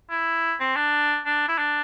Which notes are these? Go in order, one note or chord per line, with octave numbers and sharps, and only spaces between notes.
E4
C4
D4
D4
E4
D4